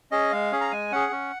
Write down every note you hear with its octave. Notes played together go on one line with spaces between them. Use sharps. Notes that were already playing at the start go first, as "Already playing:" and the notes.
C#4 G#4 D#5
G#3 F5
C#4 G#4
A#5
G#3 G#5
C#4 G#4 F#5
C#4